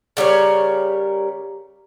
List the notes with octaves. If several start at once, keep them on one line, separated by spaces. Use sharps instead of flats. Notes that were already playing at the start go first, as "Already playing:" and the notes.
C#3 G3 A#4 C#5